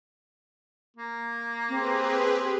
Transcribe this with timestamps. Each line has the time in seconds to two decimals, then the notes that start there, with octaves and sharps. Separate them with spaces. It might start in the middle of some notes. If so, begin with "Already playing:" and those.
0.97 A#3
1.69 C4 G4 G#4 B4